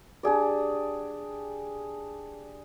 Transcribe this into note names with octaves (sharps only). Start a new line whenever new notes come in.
D4 G4 G#4 D5